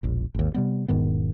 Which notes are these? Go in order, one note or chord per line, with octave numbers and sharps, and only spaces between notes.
E1 A#1
G#1 D#2
C3 G3 B3
E1 G#2 D#3 B3